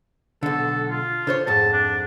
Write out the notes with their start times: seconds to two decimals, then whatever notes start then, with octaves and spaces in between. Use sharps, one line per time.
0.43 B1 D3 A4
0.89 F4
1.27 D3 C5 C#5
1.47 F2 G#2 A5
1.73 D4